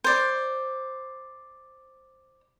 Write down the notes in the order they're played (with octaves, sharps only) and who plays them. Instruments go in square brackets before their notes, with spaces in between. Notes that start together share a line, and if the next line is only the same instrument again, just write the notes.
[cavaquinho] C5 D5